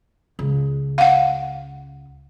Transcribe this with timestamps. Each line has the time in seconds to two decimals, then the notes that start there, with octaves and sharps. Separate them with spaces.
0.39 C#2
0.98 F5 F#5